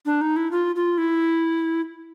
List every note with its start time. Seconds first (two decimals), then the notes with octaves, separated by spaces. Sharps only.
0.06 D4
0.21 D#4
0.36 E4
0.51 F4
0.76 F4
0.98 E4